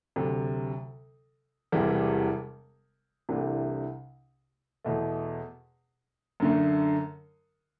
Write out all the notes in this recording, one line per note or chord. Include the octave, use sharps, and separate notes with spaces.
D2 C3 F#3
E1 E2 C3 E3 G3
C2 C3 E3 A3 D4
E2 B2 A3
F#2 D3 A3